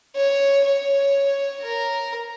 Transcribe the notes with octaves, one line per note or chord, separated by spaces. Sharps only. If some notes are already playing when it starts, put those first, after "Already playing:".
C#5
C#5
A#4